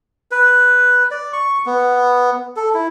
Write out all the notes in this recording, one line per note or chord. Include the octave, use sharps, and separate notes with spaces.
B4
D5
C#6
B3
A4
E4